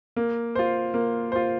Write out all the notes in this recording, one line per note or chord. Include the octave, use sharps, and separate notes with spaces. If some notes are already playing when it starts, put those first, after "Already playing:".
A#3
F4 C5
A#3
F4 C5